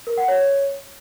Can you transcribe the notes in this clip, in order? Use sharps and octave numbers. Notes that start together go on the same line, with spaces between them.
A#4
F#5
C#5